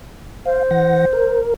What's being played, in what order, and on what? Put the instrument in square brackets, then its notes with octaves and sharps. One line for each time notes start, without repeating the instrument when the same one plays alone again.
[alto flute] C5 [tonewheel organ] F5
[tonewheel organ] E3 F#5 A#6
A#4